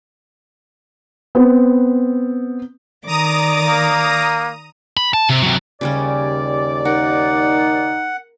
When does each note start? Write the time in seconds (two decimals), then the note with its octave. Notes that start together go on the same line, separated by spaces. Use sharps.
1.35 B3 C4
3.07 D#3 D5 A#5 D6 D#6 D#7
3.68 A#3
4.97 B5
5.14 A5
5.29 C3
5.42 C3 F#3
5.81 D#2 C#3 G3 C#4 D5
6.85 D#4 A#4 F#5